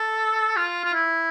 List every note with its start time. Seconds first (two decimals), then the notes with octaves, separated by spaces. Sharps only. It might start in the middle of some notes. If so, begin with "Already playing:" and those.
Already playing: A4
0.56 F4
0.84 F4
0.94 E4